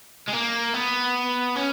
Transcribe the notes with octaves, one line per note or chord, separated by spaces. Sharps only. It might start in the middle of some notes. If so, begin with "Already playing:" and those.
G#3
A#3
B3
C#4